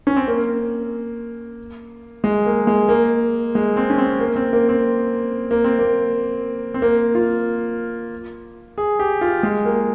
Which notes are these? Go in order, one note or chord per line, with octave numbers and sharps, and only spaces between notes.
C#4
C4
A#3
G#3
A#3
G#3
A#3
G#3
C4
C#4
C4
A#3
C4
A#3
C4
A#3
C4
A#3
C4
A#3
F4
G#4
G4
F4
G#3
A#3